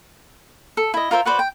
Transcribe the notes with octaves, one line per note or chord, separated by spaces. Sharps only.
A4
E4 D#5
F4 A#4 C5 E5
F#4 B4 C5 D5
G5